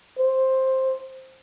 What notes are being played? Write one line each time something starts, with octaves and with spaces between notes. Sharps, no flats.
C5